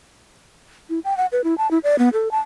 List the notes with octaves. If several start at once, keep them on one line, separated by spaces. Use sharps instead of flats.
E4
G5
F#5
B4
E4
A5
E4
D5
B3
A4
A5